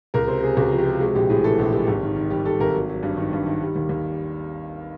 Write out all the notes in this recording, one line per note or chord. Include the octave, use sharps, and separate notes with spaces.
C#2 A#4
C3 C5
C3 G#4
C#2 F#4
F3
G4
C3
G#3 F#4
A#1 G4
A2 G#4
E3 A4
A#1 G4
G#3 G4
G#1
D#3
D#3
G3 G4
G3 A4
G#1 A#4
F#3
F#3
G2
D#3
G2
D#3
G3
D#2
D#2